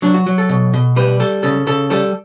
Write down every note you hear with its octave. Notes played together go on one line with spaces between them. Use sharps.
F#3 D4
F#4
F#3
A4
B2
B2
G3 B4
G3 A4
C#3 A4
C#3 A4
G3 A4